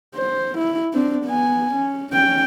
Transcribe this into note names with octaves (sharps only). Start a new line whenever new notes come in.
C5
E4
C4 D4
B3 G#5
C#4
C#4 G5